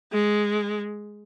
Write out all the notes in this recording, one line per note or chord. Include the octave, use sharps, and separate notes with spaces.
G#3